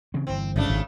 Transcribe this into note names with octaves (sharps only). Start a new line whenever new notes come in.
C#3 E3 C4
G1 E3 C4
G#1 C#3 A3 D4
G#1